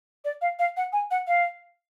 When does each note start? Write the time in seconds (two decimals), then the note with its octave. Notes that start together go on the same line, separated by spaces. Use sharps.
0.25 D5
0.42 F5
0.59 F5
0.77 F#5
0.93 G#5
1.11 F#5
1.27 F5